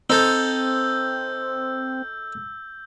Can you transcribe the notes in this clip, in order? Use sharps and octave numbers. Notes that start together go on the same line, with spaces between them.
C4 D#4 A4 E6 G6